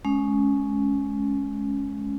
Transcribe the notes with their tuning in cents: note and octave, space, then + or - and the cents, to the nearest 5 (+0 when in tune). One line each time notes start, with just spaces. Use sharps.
G#3 +20 C#4 +0